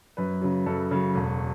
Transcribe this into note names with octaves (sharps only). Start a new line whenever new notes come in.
F#2 B4
C#3 F#3
F#2 A4
C#3 F#3
E1